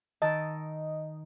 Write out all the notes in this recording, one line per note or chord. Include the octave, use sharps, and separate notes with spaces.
D#3 D#5 A5 E6